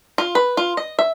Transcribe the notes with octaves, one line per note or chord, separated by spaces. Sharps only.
F4
B4
F4
D#5
E5